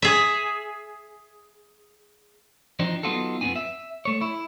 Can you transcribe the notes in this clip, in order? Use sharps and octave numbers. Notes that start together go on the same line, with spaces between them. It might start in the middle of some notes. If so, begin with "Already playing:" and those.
G#4 E5
E3 F3 C4 D4 D#4
F#3 B3 D#4 F4 F#4 A4
F2 F3 B3 C4 D4 G#5
E5
A3 C#5
E4